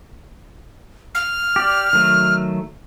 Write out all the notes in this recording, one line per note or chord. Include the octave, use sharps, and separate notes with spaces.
F6
G4 D5
D#3 F#3 A3